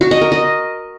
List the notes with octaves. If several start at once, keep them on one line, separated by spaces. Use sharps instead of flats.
F#4
D#5
A#4
D#5